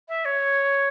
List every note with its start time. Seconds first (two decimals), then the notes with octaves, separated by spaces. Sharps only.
0.09 E5
0.25 C#5